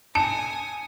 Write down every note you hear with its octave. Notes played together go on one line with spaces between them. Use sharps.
G#5 A5 D#6 C#7 E7